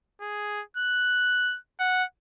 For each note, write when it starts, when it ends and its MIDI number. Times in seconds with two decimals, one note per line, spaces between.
0.21 0.62 68
0.77 1.58 90
1.80 2.04 78